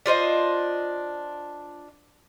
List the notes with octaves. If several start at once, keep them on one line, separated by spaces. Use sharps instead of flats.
D4 F4 C5 D#5